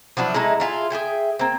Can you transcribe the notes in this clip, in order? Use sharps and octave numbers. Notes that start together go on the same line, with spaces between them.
F3 F#3 D4 E4
G#3 A3 D#4 E4
E4 F4 G#4
G#4 E5 G5 G#5
A#3 C4